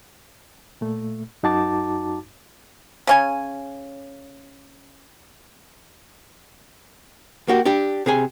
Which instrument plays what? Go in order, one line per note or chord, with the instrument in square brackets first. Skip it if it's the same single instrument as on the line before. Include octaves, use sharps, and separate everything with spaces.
[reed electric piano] A#2 A3
F#2 D#4 F#4 A5 D6 A6
[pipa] C#3 C#4 G#5
[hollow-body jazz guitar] A#3 F#4 G4
D4 G4
C3 G#4 G#5